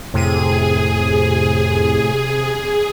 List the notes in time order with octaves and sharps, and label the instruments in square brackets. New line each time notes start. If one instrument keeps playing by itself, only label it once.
[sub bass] F2 [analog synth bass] A2 [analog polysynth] C3 D#7 [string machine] G#4